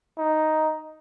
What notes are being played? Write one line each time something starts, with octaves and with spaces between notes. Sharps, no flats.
D#4